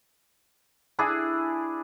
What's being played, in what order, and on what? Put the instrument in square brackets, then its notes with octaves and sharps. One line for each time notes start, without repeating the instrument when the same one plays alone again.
[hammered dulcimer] D4 E4 G#4